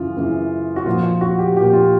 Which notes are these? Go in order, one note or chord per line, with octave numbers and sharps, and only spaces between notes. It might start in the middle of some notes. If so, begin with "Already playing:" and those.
Already playing: F#2 C#3 E3 F4
F#2 C#3 E3
F#4
A#2 F3 F4
F4
F#4
G4
A#2 F3 G4
F4